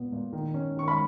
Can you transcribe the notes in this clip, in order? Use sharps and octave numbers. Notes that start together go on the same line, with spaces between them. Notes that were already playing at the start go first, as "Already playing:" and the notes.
Already playing: A#2 B3
A#2
D#3
C#4
D#3 C#6
B5